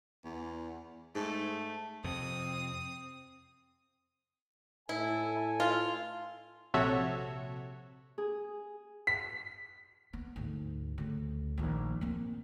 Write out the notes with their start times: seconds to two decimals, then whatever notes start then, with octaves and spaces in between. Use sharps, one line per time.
0.24 E2
1.15 G#2 A3
2.04 F2 C3 C4 D#6
4.89 A2 E4 A4 G#5
5.60 F4
6.74 A#1 C3 F#4 A4 C#5 E5
8.18 G#4
9.07 B6
10.13 B3
10.36 D2 G#2
10.98 D2 C#3
11.58 A#1 D#3
12.01 A#3 C4